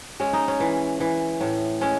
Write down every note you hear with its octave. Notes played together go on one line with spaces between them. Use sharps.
G#3 C#4
D#4
C#4
E3
E3
A2
G#3 C#4